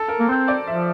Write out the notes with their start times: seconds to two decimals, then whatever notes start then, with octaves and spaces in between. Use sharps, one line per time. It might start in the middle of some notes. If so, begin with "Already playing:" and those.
Already playing: A4
0.08 A#4
0.20 A#3
0.28 C4 C5
0.48 D5
0.67 F3 E5